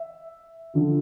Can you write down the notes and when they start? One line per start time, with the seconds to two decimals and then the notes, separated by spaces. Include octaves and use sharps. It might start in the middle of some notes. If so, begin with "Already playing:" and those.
Already playing: E5
0.74 D3 F3